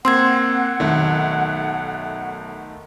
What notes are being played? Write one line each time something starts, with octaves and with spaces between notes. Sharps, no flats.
A#3 C4 F#5 C6 E6 G#6
B1 D#3 A3